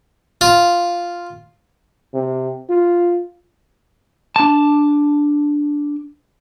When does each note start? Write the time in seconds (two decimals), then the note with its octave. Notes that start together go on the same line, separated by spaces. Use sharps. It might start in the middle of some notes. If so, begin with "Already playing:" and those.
0.41 F4
2.14 C3
2.70 F4
4.36 D4 A5